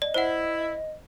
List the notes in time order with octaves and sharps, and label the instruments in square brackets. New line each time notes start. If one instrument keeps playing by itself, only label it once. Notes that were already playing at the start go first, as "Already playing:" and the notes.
[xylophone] D5 [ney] D#5
[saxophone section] E4 [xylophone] C5 F#5